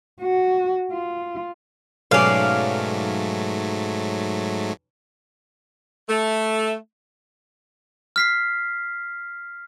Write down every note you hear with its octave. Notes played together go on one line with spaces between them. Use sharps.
F#4
F4
B1 G#2 F#3 A3 C#4 D5 F5
A3
F6 B6 C7